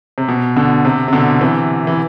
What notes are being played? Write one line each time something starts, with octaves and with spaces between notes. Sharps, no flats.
C3
B2
B2 D3
C3
C3
B2 D3
C3 E3
E3